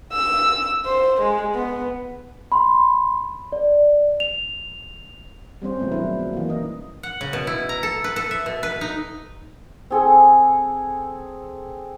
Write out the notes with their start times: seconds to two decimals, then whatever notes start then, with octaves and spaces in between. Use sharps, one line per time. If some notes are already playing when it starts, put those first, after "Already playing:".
0.13 E6
0.85 C5
1.21 G#3
1.55 B3
2.52 B5 C6
3.52 D5
4.20 F7
5.62 G3 C4 C#4 C5
5.79 B2 F3 G#3 A3 B3
5.92 D#3 F#3 D4 E4 B4
6.19 B2 A#3
6.33 E3 A#3
6.48 C#4 D#4 D#5
7.03 F#5
7.21 C#3
7.33 B2
7.47 E4
7.69 A#5
7.83 A4
8.04 B4
8.16 A4
8.31 E5
8.46 B2
8.63 B4
8.81 D#4
9.90 C4 G#4 A4